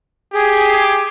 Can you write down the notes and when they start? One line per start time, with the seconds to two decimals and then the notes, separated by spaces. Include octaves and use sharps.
0.33 G4 G#4